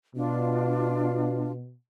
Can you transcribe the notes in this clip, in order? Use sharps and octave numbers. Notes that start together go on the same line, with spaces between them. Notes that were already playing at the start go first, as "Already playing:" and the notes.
B2 D4 F4